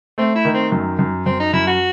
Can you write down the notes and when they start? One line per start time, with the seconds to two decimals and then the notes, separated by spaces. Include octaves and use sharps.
0.18 A3 C4
0.35 E4
0.45 D#3
0.54 C4
0.72 F#2
0.99 F#2
1.26 F#2 C4
1.39 D#4
1.53 F#2 E4
1.67 F#4